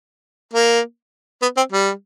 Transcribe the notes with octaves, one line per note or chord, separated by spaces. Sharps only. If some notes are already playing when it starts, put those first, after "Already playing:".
A#3
B3
C4
G3